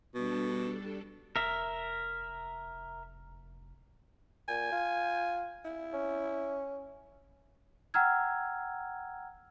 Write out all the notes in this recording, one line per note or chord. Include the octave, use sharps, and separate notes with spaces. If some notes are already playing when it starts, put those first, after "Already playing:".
B2 G3 D4 A4
F1 A#4 E5
A#2 G#5
F4
E4
C#4
F#5 G5 A#5 E6 F6 G#6